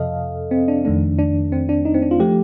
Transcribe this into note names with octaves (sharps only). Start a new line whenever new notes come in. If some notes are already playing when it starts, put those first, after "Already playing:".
Already playing: F2 C3 F3 A4 D#5 F5
C4
D4
F2 D#3 A3 D4
D4
C4
D4
D#4
C4
D4
F4
F3 A3 G4